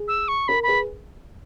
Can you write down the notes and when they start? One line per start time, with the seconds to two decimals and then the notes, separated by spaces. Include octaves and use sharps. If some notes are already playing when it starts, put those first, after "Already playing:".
Already playing: G#4
0.08 E6
0.28 C#6
0.48 A#4 B5
0.63 G#4 B4 B5